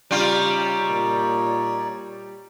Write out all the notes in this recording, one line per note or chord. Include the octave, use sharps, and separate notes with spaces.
C#3 G3 D#4 F4 C#5 D5
A#2